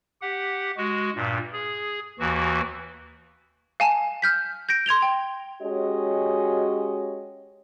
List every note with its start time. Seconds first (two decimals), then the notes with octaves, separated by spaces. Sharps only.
0.22 G4 F#5
0.77 G#3 F#4
1.15 G2 A#2
1.53 G#4
2.19 D#2 E3 F#4
3.80 F5 G#5 A5
4.22 F6 G6 B6
4.69 G6 A#6 D7
4.86 C6 G#6 F7 G7
5.02 G5
5.61 G#3 C#4 F#4 G4 C#5 D#5